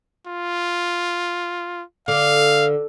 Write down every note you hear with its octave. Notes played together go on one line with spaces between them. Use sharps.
F4
D3 F5